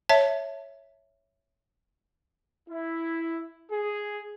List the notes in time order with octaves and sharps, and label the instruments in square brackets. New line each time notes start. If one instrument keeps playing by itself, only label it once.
[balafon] C#5 E5 A5
[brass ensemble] E4
G#4